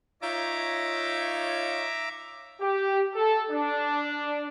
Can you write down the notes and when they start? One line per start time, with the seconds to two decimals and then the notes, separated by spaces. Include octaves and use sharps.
0.22 D#4 F4 C#5 E5 A#5 D6
2.61 G4
3.15 A4
3.50 D4